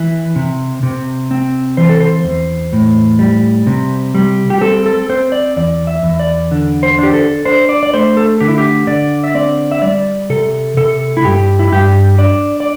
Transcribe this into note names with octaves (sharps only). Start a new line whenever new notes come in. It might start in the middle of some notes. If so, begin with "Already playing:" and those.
Already playing: E3
C3
C3
C4
E3 C5
A4
C5
E2
A2
G3
C3
G3
G4
C4 A4
A4
C4 C5
D5
E2 D5
E5
E2
D5
D3
C5
D4 G4
A4
D4 C5
D5
D5
A3 C5
A4
D3 G4
E4
G4
D3 D5
E5
C4 D5
E5
G3 D5
C3 A4
C3 A4
E4
G2 G4
E4
G2 G4
D4 D5
D5